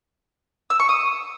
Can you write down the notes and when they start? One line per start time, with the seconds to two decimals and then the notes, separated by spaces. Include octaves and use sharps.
0.70 E6
0.80 C#6
0.89 D#6